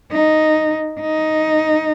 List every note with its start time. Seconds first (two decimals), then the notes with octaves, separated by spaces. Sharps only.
0.12 D#4
1.01 D#4